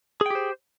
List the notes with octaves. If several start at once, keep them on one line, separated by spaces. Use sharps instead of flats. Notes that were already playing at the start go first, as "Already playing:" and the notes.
G4 G#4 C5 G5